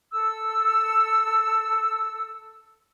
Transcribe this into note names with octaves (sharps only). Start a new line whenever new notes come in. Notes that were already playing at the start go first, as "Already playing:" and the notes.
A4 E6